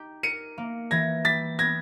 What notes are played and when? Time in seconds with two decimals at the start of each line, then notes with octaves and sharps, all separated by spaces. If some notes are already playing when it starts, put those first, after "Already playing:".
Already playing: D#4 G4
0.23 A#4 C#7 D#7
0.58 A#3
0.91 E3 G#6 A#6
1.24 G3 A6 B6
1.58 B3 G#6 A#6